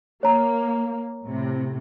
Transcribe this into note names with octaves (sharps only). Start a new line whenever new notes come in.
A#3 C#5 A#5
A2 C3